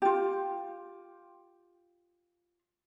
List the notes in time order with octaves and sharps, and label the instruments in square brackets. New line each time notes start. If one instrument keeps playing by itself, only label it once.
[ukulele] F4 G4